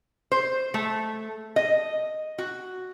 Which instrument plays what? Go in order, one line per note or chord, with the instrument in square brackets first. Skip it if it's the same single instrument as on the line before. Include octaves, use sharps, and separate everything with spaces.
[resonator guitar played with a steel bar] C5
A3
D#5
F#4